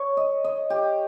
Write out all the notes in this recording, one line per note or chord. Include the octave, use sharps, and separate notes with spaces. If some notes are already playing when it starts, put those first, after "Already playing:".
Already playing: C#5
D#5
D#5
G4